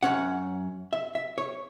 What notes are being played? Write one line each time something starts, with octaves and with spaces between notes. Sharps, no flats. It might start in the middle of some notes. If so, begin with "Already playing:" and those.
F#2 E3 C#4 F#5
E5
E5
C#5